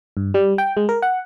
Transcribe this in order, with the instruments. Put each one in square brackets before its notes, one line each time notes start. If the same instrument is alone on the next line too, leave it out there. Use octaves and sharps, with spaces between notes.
[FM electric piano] G2
G3
G5
G#3
A#4
F#5